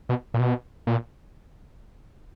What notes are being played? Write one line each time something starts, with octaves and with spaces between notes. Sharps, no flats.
B2
A#2
B2
A#2